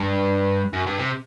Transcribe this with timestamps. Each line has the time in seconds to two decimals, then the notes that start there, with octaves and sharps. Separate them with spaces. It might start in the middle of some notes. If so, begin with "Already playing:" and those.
Already playing: G2
0.73 F#2
0.86 G2
0.99 C3